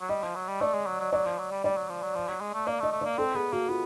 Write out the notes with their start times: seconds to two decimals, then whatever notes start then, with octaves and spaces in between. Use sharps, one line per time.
0.01 F#3
0.09 G3 D#5
0.23 F3
0.35 F#3
0.48 G3
0.61 A3 D5
0.74 G#3
0.87 F#3
1.00 F#3
1.13 F#3 D5
1.25 F3
1.38 F#3
1.51 G3
1.64 G3 D5
1.77 F#3
1.89 F3
2.02 F#3
2.15 F3
2.28 F#3
2.41 G#3
2.54 A3
2.67 A#3 D5
2.80 A3
2.83 D#5
2.92 A3
3.01 A#3 D5
3.18 C4 A4
3.34 B3 G#4
3.53 A#3 F#4
3.69 B3 F4